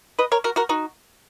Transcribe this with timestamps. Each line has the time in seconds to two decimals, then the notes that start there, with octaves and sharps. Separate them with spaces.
0.19 B4 D#5
0.32 A#4 C#5
0.44 F#4 A#4
0.56 F#4 A#4
0.69 D#4 F#4